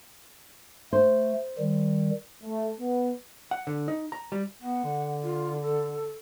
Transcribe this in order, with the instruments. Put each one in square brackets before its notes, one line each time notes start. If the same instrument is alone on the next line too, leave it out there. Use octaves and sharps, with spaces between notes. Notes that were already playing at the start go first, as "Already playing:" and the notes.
[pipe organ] A3 [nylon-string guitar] C5
[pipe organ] D#3 G3
[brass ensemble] A3
B3
[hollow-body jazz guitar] F#5
D3
D#4
A#5
G3
[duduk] B3 [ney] F#5
[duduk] D3
[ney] F4
A4